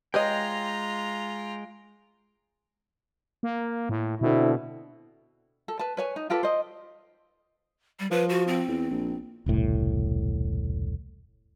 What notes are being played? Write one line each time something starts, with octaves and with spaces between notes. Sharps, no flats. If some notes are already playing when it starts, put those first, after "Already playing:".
G#3 F4 B4 C#5 D#5 G5 A#5
A#3
A2
B2 D3 C4 E4
A4
B4 A5
B4 C#5 G#5
D#4
F4 G4 A4 B4
C5 D#5
G3
F3 B4
F#4
C4
E2
A#1
E1 C2 A2